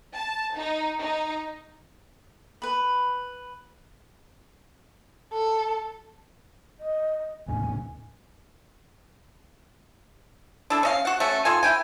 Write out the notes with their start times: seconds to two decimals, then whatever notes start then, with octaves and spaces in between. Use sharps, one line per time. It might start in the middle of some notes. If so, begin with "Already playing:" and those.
0.16 A5
0.57 D#4
1.01 D#4
2.62 B4 B5
5.33 A4
6.78 D#5
7.48 G#1 D#2 A2 G#5
10.70 D4 E4 A4
10.83 C#4 D#5 F5
11.05 F#4 F#5
11.20 A3 C#4 F#4
11.45 D#3 F4 A4 G#5
11.63 E4 G5 G#5